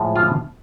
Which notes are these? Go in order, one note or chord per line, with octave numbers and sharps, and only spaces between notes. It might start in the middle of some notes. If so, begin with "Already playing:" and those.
Already playing: A2 F3 G#3
F4